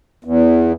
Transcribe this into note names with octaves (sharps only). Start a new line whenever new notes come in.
E2